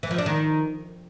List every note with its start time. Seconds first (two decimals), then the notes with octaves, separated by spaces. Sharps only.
0.03 E3
0.11 F3
0.18 D4
0.26 D#3